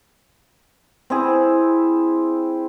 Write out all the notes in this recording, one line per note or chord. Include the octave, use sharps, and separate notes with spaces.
C4 E4 G#4